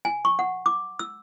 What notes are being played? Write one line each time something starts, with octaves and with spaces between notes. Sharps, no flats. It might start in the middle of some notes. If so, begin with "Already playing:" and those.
G#5
C#6
F#5
D6
E6